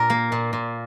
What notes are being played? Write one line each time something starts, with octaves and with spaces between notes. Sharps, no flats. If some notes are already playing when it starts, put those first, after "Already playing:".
Already playing: A#2 A#4
A#3
A#2
A#2